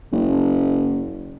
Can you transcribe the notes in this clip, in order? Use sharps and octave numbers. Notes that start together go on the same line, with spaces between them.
F#1